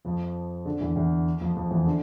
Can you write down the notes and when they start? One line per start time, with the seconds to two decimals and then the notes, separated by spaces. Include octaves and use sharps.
0.05 F2 F3
0.65 D3
0.81 E2 E3
0.96 E2 E3
1.41 F2 F3
1.56 F2 F3
1.71 E2 E3
1.86 D3